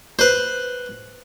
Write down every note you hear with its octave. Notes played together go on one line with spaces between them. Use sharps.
B4 C5